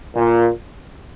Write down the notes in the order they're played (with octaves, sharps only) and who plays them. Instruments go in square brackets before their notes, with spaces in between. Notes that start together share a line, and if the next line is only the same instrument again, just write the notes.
[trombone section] A#2